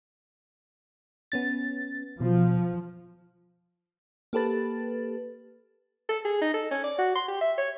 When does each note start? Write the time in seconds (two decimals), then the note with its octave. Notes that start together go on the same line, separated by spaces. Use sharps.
1.32 B3 C#4 A6
2.20 B2 F3
4.33 A#3 G4 A4 B4 A6
6.09 A4
6.25 G#4
6.41 D#4
6.54 A4
6.71 C#4
6.83 D5
6.99 F#4
7.15 C6
7.28 G4
7.41 E5
7.58 C#5